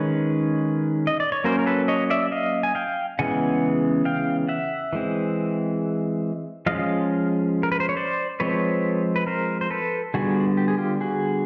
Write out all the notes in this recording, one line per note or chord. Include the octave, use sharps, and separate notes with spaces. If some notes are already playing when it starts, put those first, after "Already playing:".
Already playing: D#3 G#3 C#4 B4 C#5
D#5
D5
C#5
F#3 A#3 C#4 A#4 C5
A#4
A4 B4
C#5 D#5
D5 E5
D#5 F5
G#5
F5 G5
C#3 E3 G#3 B3 F#5 G#5
F5 G5
E5 F#5
E3 G#3 C4
F3 G#3 C#4 D#5 F5
A#4
B4
C5
C#5
C5 D5
F3 G#3 C4 B4 C#5
B4
A#4 C5
C5
A4 B4
D3 G3 B3 F#4 G#4
G4
G#4
F4 G4
F#4 G#4